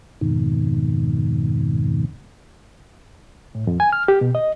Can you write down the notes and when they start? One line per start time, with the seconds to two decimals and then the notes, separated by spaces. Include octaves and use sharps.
0.21 F2 G#2 B2 D#3
3.55 A2
3.67 F2
3.80 G#5
3.93 F6
4.08 G4
4.21 B2
4.35 D#5